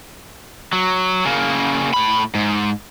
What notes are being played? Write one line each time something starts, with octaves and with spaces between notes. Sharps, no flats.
F#3
C#3 A#3
A2 B5
G#2